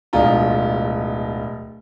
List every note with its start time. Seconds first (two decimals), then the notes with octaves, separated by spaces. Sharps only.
0.13 D1 B2 G#3 D4 F4 A#5